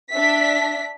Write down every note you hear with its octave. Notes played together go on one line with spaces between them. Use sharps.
D4 E5 B6